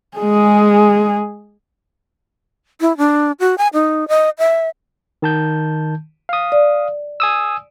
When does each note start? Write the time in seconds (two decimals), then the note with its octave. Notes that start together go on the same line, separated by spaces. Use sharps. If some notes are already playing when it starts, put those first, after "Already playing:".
0.18 G#3 G#4
2.81 E4
2.98 D4
3.40 F#4
3.58 G#5
3.74 D#4
4.08 D#5
4.39 E5
5.22 D#3 A5 G6
6.29 F5 D#6
6.52 D5
7.20 G#5 D#6 E6